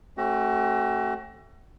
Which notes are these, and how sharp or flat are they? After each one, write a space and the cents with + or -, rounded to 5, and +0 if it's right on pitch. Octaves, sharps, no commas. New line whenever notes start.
A3 +0 C4 +45 F#4 +40